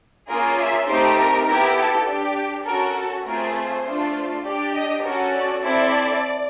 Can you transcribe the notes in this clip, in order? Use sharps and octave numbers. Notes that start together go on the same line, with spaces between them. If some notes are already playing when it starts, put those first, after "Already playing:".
A#3 C#4 F4 G#4 A#4
E5
A3 C4 D#4 G4 C5
A#4
B3 E4 G4 A#4
A4
D4 G4
C#4 F#4 A4 A#4
A4
A3 C4 F4 G#4 A#4
C5
A3 D4 F4
D4 G4 D5
D#5
C#4 F#4 A4 A#4
D5
C4 E4 A4 D5